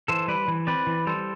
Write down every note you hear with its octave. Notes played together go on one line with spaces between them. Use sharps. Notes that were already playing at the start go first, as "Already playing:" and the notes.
E3 A4 C5
G3 B4 D5
E3
C4 B4 D5
E3
G3 A4 C5